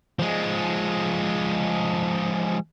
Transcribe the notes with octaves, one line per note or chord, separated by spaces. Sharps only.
F3 G#3